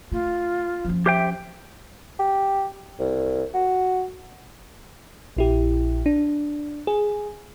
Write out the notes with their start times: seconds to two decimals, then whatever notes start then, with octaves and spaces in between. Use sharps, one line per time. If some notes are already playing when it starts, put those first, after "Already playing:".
0.12 A3 F4
0.85 F3 C#4
1.06 G4 C5 E5 G5
2.19 G4
2.99 C2
3.54 F#4
5.37 A#1 E4 G4
6.06 D4
6.87 G#4